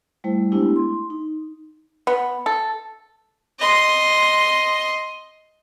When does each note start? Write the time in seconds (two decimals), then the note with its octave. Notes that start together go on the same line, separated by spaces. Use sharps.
0.24 G3 A3 E4 C5
0.52 G#3 A3 B3 D4 E4 G4
0.76 C6
1.10 D#4
2.07 B3
2.46 A4
3.59 D#5 C6